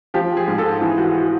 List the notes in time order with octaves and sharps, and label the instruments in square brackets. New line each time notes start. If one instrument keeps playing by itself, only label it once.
[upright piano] F3 G4
G#4
G#2
A4
E3 G#4
F#4
F#4